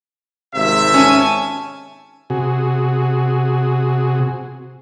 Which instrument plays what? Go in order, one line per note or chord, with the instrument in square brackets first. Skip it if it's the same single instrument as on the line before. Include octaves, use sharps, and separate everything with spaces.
[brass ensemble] G#1 C3 E5
[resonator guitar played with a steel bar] C#4 [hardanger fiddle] G#5 A5
[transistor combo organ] C3 F#4 G#4